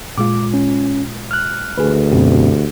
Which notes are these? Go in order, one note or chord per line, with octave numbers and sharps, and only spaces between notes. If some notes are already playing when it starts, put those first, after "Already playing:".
A#2 G#3 F4 D6
C#4
F6 F#6
D2 G#4 B4
F#2 B2 C4 G4